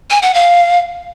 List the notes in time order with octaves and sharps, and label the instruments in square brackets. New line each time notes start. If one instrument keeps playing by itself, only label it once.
[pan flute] G#5
F#5
F5